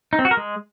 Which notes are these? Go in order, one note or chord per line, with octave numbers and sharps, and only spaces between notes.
D#4
C4
F#4
A#4
G#3